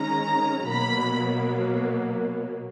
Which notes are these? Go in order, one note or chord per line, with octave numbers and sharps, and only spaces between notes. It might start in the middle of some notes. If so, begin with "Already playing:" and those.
Already playing: D#3 G#3 C#4 A#5
B2 F#3 A#3 B5